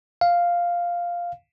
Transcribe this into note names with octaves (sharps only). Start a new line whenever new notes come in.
F5